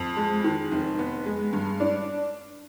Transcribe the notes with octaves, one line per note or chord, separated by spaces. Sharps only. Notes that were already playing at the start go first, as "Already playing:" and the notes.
Already playing: F2
G#3
D#3
F1
B3
G#3
G2
D4